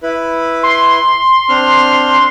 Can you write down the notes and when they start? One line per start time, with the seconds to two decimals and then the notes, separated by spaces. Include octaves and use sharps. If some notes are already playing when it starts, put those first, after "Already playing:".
0.03 E4 B4
0.63 C6
1.49 C4 D4 F6